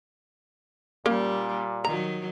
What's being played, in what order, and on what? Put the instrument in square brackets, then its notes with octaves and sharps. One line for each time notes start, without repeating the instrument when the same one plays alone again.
[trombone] A#2 [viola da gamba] G3 [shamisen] A#3 C#4
[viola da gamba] D#3 F#3 [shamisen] A#5